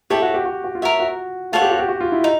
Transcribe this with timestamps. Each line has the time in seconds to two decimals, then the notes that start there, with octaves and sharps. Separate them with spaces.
0.10 E4 G4 A4 C#5
0.22 F#4
0.34 G4
0.45 F#4
0.64 F#4
0.75 F4
0.82 F#4 A#4 C#5 E5
1.00 F#4
1.52 F4 F#4 A4 C#5 F#5
1.62 G4
1.71 F#4
1.79 G4
1.89 F#4
2.01 F4
2.12 E4
2.24 D#4